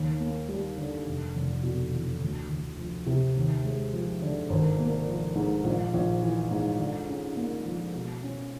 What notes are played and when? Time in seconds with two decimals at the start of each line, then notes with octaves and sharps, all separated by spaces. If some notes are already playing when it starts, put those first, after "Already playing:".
Already playing: D#2
0.20 A#3
0.48 G3
0.77 D3
1.06 F1
1.35 F1
1.63 B2
1.93 E2
2.21 D2
2.49 D2
2.78 F3
3.06 C3
3.36 D#2
3.64 G#3
3.93 F3
4.22 D3
4.49 G#1
4.79 A#3
5.07 F3
5.35 G#2
5.64 A#1
5.93 A#1
6.22 E3
6.51 G#2
6.79 D3
7.09 C#4
7.36 A#3
7.65 F3
7.94 B2
8.23 C#4